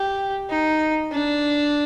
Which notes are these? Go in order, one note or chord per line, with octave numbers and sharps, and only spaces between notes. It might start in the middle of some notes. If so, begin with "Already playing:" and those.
Already playing: G4
D#4
D4